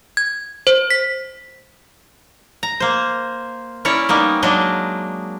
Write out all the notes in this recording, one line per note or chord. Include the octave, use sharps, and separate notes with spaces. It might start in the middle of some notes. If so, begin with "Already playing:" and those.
G#6
C5
B6
A#5
A#3 C5
C#4 E4 A#4 C#5 D5
G3 A#3 B3 D#4
F#3 G#3 A#3 D4 D#5